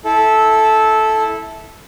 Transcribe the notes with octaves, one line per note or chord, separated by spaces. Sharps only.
E4 A4